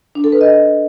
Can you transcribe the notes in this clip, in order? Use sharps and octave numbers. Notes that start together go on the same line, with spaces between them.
D4
A4
B4
D#5